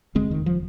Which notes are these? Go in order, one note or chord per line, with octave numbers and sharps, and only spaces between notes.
F1 D#2 C#3 G#3 C4
D#3
F3